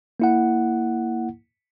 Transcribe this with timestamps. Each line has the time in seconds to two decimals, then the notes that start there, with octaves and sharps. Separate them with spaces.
0.20 A#3 E4 F#5